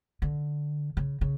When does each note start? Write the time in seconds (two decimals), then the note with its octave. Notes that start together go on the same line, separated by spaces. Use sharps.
0.22 D3
0.97 C#3
1.21 C#3